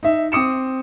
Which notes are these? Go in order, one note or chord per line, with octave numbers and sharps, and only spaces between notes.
D#4 E5
C4 D6 D#6 C#7 E7